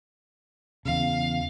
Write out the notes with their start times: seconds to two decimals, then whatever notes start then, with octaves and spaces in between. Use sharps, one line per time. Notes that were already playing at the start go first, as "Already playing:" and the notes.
0.85 E2 C#3 F5